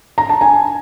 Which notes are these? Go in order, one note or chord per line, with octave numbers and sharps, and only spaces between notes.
A#5
A5
G#5